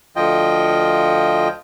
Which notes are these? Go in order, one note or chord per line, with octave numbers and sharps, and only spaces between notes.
D2 F3 F4 D#5 G5